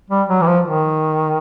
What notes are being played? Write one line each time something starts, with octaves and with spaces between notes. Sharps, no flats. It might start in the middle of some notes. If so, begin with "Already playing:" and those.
G3
F#3
E3
F3
D#3